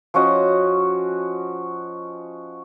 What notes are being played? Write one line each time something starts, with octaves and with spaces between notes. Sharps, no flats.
F3 C#4 F#4 D#5